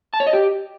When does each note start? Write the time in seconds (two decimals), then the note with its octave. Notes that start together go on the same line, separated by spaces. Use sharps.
0.14 A5
0.20 C#5
0.27 D#5
0.33 G4